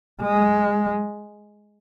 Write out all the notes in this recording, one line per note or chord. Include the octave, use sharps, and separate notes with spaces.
G#3